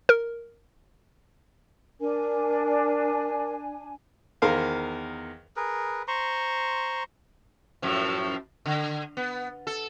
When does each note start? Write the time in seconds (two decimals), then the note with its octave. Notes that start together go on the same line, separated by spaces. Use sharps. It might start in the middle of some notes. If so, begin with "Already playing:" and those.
0.09 A#4
2.01 D4 A#4 G#5
4.42 E2 D#3 A#4 C5 F5
5.56 G#4 A#4 B4
6.08 C5 A#5 C6 C#6
7.82 F#2 A2 F3
8.66 D3
9.17 B3
9.67 A4